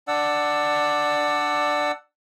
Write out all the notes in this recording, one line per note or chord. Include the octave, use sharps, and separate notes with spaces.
D4 D5 F#5 E6